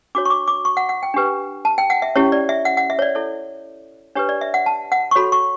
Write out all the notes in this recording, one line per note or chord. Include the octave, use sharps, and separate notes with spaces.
D4 F#4 C#5 D6
C#6
D6
D6
C#6
F#5
F#5
G5
D4 G4 B4
A5
G5
F#5
E5
C#4 E4 G4 C#5
D5
E5
F#5
F#5
E5
C#5
D5
E4 A4 C#5
D4 G4 B4 C#5
D5
E5
F#5
A5
F#5
C#6
F#4 A4 C#5 B5
C#6